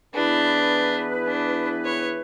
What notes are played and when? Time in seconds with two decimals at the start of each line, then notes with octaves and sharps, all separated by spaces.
0.15 E3 B3 D4 E4 G#4 B4
1.27 D4
1.85 C#5